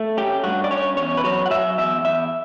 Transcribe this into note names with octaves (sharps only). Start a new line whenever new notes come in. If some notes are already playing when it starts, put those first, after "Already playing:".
Already playing: A3
C#4 G4
G2 F#4
D5
C#4 C#5
E2 C#5
B4
F#3 C#5
F#5
F#3 E5
E2 E5
E2 E5